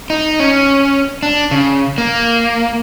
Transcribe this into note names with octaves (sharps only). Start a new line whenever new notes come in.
D#4
C#4
D4
C#3
A#3